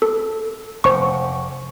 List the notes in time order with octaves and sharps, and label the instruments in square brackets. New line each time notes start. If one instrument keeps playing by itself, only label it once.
[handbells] A4
[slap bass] F1 [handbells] C5 C#6